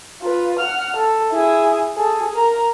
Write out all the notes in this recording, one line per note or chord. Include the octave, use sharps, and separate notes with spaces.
F4 B4
F#5 F6
A4
E4 G#4
G#4 A4
A#4 A#5